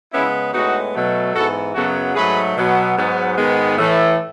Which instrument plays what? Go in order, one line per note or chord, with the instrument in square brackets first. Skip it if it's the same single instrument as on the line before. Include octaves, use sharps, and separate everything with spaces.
[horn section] C#3 G#3 B3 C#4 E4
A2 G#3 B3 D#4 F#4
B2 F#3 A3
G#2 E3 B3 F#4 A4
F#2 C#3 F#3 B3 F#4 A4
G#2 F#3 A3 G#4 B4
B2 F#3 B3
G#2 F#3 B3
G#2 D#3 G#3 B3
A2 E3 A3